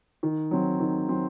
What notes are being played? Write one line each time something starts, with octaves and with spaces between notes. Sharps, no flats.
D#3
F#3 C4
D#3
F#3 C4